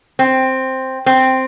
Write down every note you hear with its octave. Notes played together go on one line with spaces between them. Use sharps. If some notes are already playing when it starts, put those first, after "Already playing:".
C4
C4